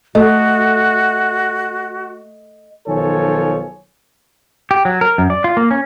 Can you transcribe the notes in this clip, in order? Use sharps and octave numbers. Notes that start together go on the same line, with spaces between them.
A3 F#4 D#5
B1 D#3 F3 A4 C#5 G#5
G4
F#3
A#4
F#2
D5
F4
A#3
C#4